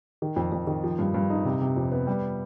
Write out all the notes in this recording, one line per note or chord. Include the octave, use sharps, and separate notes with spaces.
D#3
F2
F2
D#3
F3
G2
G2
D#4
C3
C3
F2
B3
G3